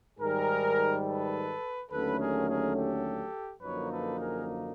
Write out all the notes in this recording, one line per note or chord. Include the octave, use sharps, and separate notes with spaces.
G#2 D#3 G3 G#4 A#4
A4 B4
D#2 D3 F#3 A3 C#4 A4 B4
G#4 A#4
G#4 A#4
G4 A4
F#2 D3 F3 A#3 D#4 B4 C#5
A4 B4
G#4 A#4